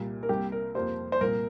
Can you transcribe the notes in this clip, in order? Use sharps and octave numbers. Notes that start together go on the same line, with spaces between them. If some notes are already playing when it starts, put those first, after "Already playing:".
Already playing: C2 A#2 G3 A#3
A#4
C2 C3 A#3 G4
A#4
F2 F3 A#3 G4 C5
C5
C2 A#2 A#3 A#4